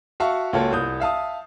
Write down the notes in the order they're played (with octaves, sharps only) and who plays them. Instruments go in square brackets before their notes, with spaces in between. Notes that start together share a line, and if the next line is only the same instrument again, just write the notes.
[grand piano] F#4 E5 F5 A5 C#6
C#2 A#3 F4 F#4 A4 C#5
C2 D#6 G6
E5 F5 A5 D#6